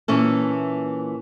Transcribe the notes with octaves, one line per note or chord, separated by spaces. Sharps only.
A#2 E3 C#4 A4